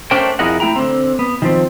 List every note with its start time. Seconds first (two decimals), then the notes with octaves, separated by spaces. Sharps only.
0.11 A3 C#4 D4 A#4 C5 G5
0.39 F2 E4 G#4 A#4 D#5 F#5
0.60 A3 E4 G5 A#5
0.76 D3 C4
1.19 B3
1.42 D#3 F3 C4